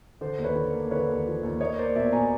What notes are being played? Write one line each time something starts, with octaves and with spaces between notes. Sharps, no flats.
D3 C5 D5
D#2
B4 C#5
D3
A#3
D3 B4 C#5
D#2
F3
D#2
A#3 C#5 D#5
A#3 C5 D5
B2 D5 E5
B2 G#5 A#5